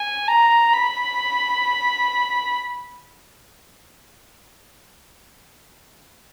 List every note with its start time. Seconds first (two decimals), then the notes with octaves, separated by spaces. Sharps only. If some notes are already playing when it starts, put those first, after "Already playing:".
Already playing: G#5
0.28 A#5
0.73 B5